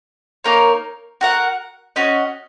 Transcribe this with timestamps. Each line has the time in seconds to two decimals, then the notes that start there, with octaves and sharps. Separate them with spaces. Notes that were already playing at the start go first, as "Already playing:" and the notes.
0.44 A#3 D#4 A#4 C#5
1.21 F#4 A#4 F#5
1.96 C#4 F#4 D#5